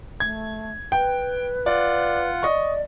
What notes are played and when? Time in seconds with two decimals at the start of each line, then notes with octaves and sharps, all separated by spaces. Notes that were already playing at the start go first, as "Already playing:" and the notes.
0.20 A3 G#6
0.92 B4 G5
1.66 F4 D5 F#5
2.43 D5 D#5 C#6